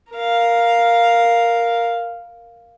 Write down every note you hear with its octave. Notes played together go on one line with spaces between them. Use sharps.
A#4 F5